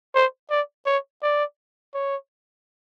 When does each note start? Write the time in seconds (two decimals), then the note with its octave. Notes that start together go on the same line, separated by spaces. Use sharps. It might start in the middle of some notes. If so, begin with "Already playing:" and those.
0.15 C5
0.50 D5
0.86 C#5
1.22 D5
1.94 C#5